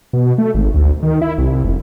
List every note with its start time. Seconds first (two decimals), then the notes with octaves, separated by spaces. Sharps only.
0.13 B2
0.38 A3
0.54 G#1
0.74 D2
1.03 D#3
1.22 E4
1.38 C2
1.64 F1